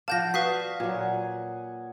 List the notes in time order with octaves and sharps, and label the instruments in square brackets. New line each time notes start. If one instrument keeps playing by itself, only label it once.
[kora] F3 D5 [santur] F5 F#5 [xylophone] A5 G6 A#6
[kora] F#4 [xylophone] B4 F5 B6 [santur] D#6
[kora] A#2 F#3 [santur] F#5 G#5